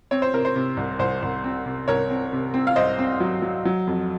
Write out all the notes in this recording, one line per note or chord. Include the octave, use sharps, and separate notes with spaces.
C4 C#5
C5
C3 A#4
C5
C3
C2
C2 C5
C2
C4
C3
C2 A#4 C#5
C4
C3
C4
F5
C2 C5 D#5
C4
F#3
F#3
F#3
F2